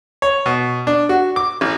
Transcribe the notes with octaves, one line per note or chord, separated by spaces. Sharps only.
C#5
B2
D4
F#4
D6
A1